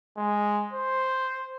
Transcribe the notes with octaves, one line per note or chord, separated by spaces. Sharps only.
G#3
C5